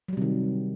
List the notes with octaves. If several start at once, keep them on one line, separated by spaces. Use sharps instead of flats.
C3 D#3 F#3 G3